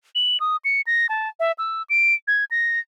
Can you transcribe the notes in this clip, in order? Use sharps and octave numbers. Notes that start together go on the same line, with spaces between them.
F#7
D#6
C#7
A#6
A5
E5
E6
D7
G#6
A#6